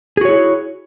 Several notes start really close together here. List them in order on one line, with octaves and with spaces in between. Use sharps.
G#4 F#4 C#5 E4